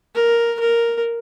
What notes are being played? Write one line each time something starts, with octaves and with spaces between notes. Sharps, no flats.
A#4
A#4